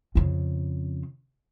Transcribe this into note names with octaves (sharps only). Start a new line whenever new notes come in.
F2 C#3